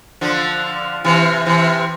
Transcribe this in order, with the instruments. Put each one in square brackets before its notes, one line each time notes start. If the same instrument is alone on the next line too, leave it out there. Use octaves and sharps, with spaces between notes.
[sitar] D3 F3
C3 E3
C3 E3